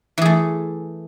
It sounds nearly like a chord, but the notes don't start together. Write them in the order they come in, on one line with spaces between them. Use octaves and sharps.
E3 G#4 A3